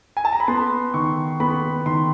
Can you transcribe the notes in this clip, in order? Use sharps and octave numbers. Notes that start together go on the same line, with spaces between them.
G#5
A5
A#5
B5
B3 C6
D#3 C#6
B3 B5
D#3 C6